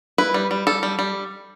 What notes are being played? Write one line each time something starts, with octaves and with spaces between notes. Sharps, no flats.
E4 B4
G3
G3
G3 A4
G3
G3